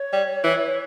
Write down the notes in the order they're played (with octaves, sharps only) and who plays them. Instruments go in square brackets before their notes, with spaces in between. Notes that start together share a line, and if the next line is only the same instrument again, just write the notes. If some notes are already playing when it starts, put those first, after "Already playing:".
Already playing: [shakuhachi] C#5
[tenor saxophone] G3
E3